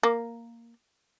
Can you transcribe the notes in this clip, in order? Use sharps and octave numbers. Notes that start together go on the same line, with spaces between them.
A#3